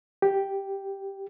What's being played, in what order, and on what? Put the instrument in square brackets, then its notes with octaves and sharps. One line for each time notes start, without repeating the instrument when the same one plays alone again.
[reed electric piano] G4